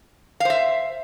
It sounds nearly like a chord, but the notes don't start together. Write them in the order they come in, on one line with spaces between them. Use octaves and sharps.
F5 C5 E5